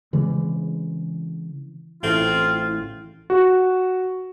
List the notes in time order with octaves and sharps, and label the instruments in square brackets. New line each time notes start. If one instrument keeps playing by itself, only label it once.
[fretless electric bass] C#3 E3 G#3 C4
[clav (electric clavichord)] A1 A3 [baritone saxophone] C4 [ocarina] E4 [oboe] F4
[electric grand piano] F#4